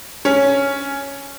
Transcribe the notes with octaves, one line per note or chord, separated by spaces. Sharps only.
C#4